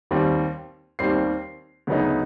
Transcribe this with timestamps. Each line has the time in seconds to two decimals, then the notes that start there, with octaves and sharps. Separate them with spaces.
0.11 D#2 D#3 G3 C4
0.99 D#2 D#3 G3 C4 C7
1.87 D2 C#3 F#3 B3 D#4